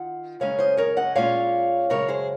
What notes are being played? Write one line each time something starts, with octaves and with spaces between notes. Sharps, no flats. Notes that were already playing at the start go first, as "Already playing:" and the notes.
Already playing: D#3 F4 F#5
F#2 C#3 G#3 C#4 C#5 F5
C5 D#5
A#4 C#5
D#5 F#5
A#2 G#3 C#4 F4 C#5 F5
F#2 C#3 G#3 A#4 C#5
G#4 C5